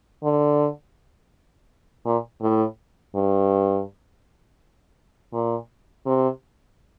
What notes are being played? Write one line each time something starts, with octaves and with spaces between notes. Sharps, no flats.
D3
A#2
A2
G2
A#2
C3